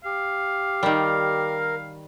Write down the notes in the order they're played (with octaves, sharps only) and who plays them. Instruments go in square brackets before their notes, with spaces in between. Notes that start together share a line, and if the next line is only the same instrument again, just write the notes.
[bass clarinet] G4 [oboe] F5
[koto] D#3 G3 [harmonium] A#4